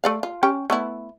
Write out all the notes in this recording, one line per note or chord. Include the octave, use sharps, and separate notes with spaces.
A3 D5 F5
F4
C#4 G4 G5
A3 B3 E4